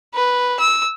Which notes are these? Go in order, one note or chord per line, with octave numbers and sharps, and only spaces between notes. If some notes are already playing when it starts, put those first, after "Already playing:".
B4
E6